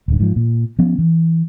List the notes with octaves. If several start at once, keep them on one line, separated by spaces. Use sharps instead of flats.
D1 G2
G#2 F3
A#2
F3 B3 C#4
E3